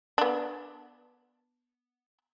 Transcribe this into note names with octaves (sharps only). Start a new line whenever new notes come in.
B3 D4